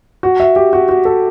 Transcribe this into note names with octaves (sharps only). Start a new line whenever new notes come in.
F#4
E5
G4
F#4
F#4
A4